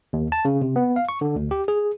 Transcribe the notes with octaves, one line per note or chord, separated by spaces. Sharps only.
D#2
A5
C#3
C3
B3
F5
C#6
D3
D2
G4
G#4